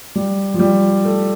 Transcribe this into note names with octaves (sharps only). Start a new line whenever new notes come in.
G3
F3
G3
A3